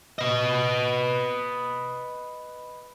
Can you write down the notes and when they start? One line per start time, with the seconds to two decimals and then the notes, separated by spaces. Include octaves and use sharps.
0.19 B4 D#5